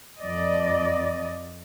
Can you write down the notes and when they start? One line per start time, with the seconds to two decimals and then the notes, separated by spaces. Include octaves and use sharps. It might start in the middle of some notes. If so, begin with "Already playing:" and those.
0.20 F2 D5 D#5